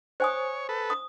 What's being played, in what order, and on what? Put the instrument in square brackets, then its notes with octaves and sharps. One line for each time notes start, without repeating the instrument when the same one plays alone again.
[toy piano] C5 G#5 D#6 [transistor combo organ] C#5
[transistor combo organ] A4 B4
[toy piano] D#6